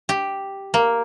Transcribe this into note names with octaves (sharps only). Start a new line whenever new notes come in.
G4
A#3